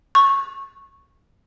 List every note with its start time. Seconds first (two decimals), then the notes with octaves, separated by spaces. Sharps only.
0.15 C#6